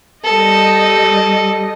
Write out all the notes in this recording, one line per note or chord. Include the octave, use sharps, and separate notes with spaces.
G3 A4 D#5